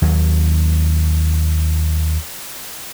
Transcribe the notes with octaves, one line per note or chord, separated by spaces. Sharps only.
D#2 F#3